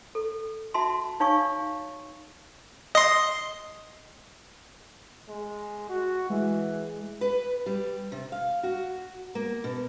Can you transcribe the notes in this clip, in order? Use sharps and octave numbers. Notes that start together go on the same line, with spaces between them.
A4
F#4 E5 A5 C6
D#4 C#5 F5 G#5 C#6 D#6
D#5 C6
G#3
F#4
E3 G#3
B4
G3
C3
F5
F#4
A#3
B2